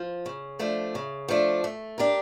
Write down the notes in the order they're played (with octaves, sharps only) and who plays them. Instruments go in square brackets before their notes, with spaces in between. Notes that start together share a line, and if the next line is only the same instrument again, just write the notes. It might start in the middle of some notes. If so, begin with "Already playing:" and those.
Already playing: [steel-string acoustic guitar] F3
C#3
F3 A3 D4
C#3
F3 A3 D4
A3
D4 G4 A#4